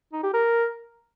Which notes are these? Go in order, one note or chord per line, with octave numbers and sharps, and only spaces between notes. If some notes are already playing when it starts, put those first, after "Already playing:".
D#4
G4
A#4